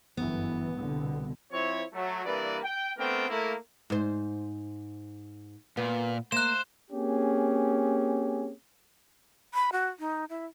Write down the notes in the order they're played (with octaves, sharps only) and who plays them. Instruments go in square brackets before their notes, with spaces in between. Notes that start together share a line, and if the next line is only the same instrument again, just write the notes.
[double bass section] G1 F#2 E3 [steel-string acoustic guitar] B3
[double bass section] C2 B2 D3
[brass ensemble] F3 C4 E4 C#5
F#3 A3
G2 E3 A#3 B4 D5
G5
A3 B3 C4 D4 A#4 G5
A3 A#3 E4
[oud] G#2 C5
[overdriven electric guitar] A#2 [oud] B3
[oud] A#3 [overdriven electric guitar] C5 [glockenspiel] F#6 E7
[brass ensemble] A#3 C4 C#4 G4 G#4
[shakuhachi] B5
F#4
D#4
E4